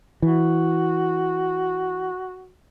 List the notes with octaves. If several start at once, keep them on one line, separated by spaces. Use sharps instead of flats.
E3 F#4